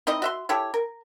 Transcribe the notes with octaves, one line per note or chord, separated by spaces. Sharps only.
C4 D#4 E4 D#5
F#4 E5 C6
E4 G4 A4 C#5
A#4